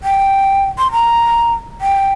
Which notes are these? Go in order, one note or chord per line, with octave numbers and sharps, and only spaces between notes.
G5
C6
A#5
G5